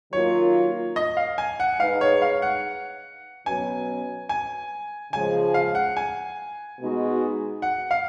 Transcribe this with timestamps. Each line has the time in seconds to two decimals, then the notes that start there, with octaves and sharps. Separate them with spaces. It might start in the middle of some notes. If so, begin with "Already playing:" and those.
0.13 D#3 F#3 A#3 F4 C#5
0.96 D#5
1.17 F5
1.38 G#5
1.60 F#5
1.79 G#3 D#4 G#4 B4 F5
2.01 C#5
2.22 F5
2.42 F#5
3.46 B2 F#3 C#4 F#4 B4 G#5
4.29 G#5
5.12 C#3 F3 G#3 G#5
5.54 F5
5.75 F#5
5.97 G#5
6.79 B2 G#3 D#4 F#4
7.62 F#5
7.91 F5